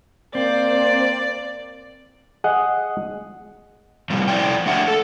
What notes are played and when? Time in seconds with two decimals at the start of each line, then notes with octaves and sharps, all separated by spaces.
0.35 A#3 C4 C5 D5
2.44 G#4 D#5 F#5
4.10 A2 C3 F3 G3
4.28 F3 E4 D5 G5
4.66 A3 D4 G4 E5 F#5
4.88 A4